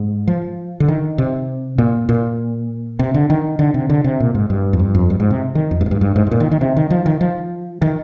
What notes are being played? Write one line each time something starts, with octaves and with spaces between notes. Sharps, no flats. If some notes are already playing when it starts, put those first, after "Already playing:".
Already playing: G#2
F3
D3
D#3
C3
A#2
A#2
C3
D3
D#3
D3
C3
D3
C3
A#2
G#2
G2
F2
G2
F2
G2
G#2
C3
D#3
F2
G2
G#2
G2
G2
G#2
G#2
A#2
D#3
D#3
C3
D#3
F3
D#3
F3
D#3